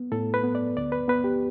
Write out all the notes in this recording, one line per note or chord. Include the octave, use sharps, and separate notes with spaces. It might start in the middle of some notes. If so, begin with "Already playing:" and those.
Already playing: B3
A2 A4
B4
B3
D5
D2 D5
B4
B3 B4
G4